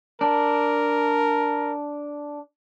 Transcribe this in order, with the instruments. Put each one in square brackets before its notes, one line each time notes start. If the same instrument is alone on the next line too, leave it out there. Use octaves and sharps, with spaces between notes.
[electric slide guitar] D4 [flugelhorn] A#4